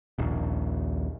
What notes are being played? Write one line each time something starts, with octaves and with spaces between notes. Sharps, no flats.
D#1 A#1